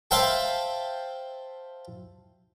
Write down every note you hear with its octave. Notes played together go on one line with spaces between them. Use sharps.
C5 E5 F5 G5 A5 B5